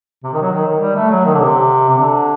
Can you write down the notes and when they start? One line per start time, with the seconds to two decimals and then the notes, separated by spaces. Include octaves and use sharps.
0.24 C3
0.33 D#3
0.42 F#3
0.52 D#3
0.67 D#3
0.81 G3
0.96 A3
1.10 F#3
1.25 D#3
1.34 D3
1.40 C3
1.89 C3
1.98 D3